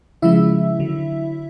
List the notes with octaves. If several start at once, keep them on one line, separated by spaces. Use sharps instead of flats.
C#3 F3 G#3 E4 E5
D3 F#3